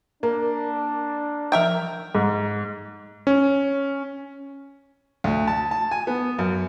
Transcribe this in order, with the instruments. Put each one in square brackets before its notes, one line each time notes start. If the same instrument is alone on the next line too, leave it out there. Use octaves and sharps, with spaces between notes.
[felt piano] A#3 [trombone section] D4 [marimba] A#4
[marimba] F3 A#5 [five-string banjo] A#4 E5 G5
[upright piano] G#2
[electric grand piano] C#4
[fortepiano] D2
A5
A5
G#5
B3
F#2